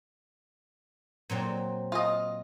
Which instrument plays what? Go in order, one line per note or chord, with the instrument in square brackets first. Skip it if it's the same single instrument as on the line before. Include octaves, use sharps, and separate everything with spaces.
[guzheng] A#2 F#3 C4
[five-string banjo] F4 D#5